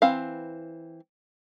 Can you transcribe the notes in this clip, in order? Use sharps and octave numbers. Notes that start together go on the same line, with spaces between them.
E3 C4 F5